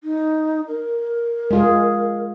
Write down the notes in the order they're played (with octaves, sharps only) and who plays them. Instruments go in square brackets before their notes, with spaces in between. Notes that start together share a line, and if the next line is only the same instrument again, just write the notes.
[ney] D#4
A#4
[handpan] G#3 F4 G#4